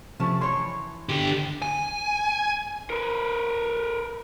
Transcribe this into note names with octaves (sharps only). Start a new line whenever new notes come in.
C3 F3 A3 C#4 A5
E3 C#5 C6
D3 G4
G#5
A#4 B4